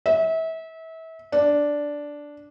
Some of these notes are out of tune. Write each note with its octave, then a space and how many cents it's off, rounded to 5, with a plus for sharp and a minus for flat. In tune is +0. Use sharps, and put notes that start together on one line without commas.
E5 -30
D4 -5